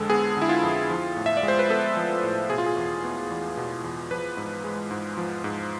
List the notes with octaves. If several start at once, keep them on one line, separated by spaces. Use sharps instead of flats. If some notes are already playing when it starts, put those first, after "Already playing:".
Already playing: F2 D3 G#3 A4
B3 G#4
D3 E4
F4
F2
F3
A2
E5
D5
G#3
C5
B4
B3 A4
F3
A2
B2 G#4
F4
G#4
E2
B3
E2
B2
E2
F3 B4
G#2
G#3
G#2
F3
G#2